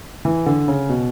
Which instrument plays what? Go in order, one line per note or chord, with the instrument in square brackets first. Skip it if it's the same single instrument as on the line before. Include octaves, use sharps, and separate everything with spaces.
[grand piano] E3
D3
C#3
B2